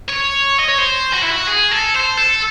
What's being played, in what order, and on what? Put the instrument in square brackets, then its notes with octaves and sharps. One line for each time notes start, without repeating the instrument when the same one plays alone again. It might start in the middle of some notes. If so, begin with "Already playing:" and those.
[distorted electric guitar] C#5
D#5
C#5
C5
F#4
E4
F#4
G#4
A4
C5
A4